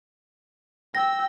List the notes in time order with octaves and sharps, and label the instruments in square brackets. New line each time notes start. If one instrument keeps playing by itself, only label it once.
[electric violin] G5 E6 [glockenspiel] A#6